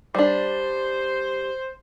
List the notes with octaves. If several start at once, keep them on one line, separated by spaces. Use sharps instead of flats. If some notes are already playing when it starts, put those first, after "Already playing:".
G3 D4 C5